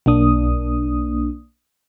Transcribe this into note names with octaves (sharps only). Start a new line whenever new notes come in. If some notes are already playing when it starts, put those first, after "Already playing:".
B1 A#3 D4 D#6